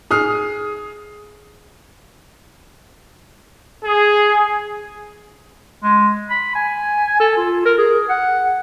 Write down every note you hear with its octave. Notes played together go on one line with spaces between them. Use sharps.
G#4 D#6 F6 C7
G#4
G#3
B5
G#5
A4
F4
A#4
G#4
F#5